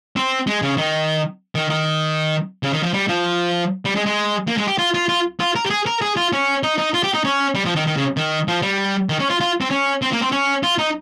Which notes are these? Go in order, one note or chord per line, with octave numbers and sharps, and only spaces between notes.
C4
G#3
C#3
D#3
D#3
D#3
C#3
D#3
F3
G3
F3
G3
G#3
G#3
A#3
G#3
G4
F4
F4
F4
F4
A#4
G4
G#4
A#4
G#4
F4
C#4
D#4
D#4
F4
G4
D#4
C#4
G3
F3
D#3
D#3
C#3
D#3
F3
G3
D#3
C#4
F4
F4
C4
C#4
C4
A#3
C4
C#4
F4
D#4